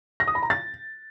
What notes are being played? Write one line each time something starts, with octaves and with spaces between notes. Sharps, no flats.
A#6
D#6
B5
A#5
A6